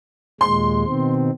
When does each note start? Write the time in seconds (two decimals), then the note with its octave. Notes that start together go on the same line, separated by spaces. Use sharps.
0.41 D#2 A#2 G#3 C6
0.86 B2 D#3 C4